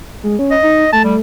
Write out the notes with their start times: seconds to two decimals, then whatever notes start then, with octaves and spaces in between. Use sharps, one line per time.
0.23 G#3
0.39 C#4
0.51 D#5
0.63 D#4
0.93 A3 A5
1.04 G3